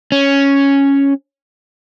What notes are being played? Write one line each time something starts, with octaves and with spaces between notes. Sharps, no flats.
C#4